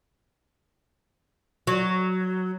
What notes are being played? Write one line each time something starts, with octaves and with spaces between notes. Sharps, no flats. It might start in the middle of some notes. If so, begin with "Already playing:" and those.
F#3